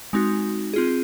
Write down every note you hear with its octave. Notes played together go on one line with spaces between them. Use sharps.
G#3 C4 D#4 F#4
C4 F4 G#4